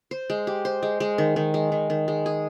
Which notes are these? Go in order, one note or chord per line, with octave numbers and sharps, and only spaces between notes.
C5
G#3
G4
C5
G#3
G#3
D#3
D#3
G#3
D#3
D#3
G#3
G#4